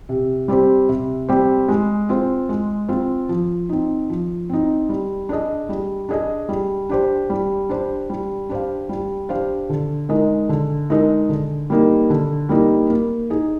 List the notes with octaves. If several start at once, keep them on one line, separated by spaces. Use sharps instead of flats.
C3
G3 C4 G4 C5
C3
G3 C4 G4 C5
G#3
C4 F4 C5
G#3
C4 F4 C5
F3
C4 D#4
F3
C4 D#4
G3
D4 G#4 D#5
G3
D4 G#4 D#5
G3
D4 G4 C5
G3
D4 G4 C5
G3
D4 G4 C5 F5
G3
D4 G4 C5 F5
D3
G#3 D#4 A#4 D#5
D3
G#3 D#4 A#4 D#5
D3
G3 A#3 D#4
D3
G3 A#3 D#4
A#3
D#4 G#4